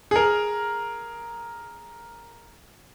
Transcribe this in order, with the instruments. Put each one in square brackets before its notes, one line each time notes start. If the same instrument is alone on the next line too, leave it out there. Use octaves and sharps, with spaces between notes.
[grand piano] G#4 A#4